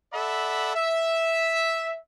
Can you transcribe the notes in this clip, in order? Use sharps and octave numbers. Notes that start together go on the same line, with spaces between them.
A4 D5 E5 F#5 B5
E5